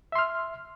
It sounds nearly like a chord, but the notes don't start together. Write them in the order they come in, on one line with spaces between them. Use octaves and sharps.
E5 C6 F6